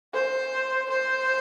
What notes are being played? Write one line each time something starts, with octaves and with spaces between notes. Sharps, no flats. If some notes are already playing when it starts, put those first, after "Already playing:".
C5
C5